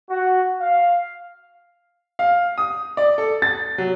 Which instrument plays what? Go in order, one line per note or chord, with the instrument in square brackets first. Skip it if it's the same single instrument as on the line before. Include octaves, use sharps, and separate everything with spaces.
[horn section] F#4
F5
[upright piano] F5
D#6
D5
A4
A6
F#3